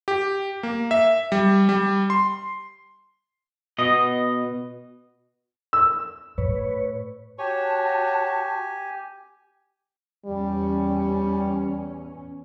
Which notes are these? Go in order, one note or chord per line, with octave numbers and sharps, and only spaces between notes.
G4
A#3
E5
G3
G3
C6
B2 D#5
E6
A2 B4 C#5
F#4 G4 C#5 G#5 A5
E2 G3 C#4